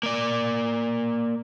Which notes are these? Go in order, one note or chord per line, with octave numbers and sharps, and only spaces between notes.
A#3 D5